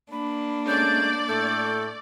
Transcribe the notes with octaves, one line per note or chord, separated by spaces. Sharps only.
A#3 D4 B5
G#3 A3 C#4 D5 G6
A2 A3 A4 G6